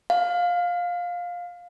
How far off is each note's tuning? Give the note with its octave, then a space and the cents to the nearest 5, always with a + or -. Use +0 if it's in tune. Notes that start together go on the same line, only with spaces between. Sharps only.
F5 +15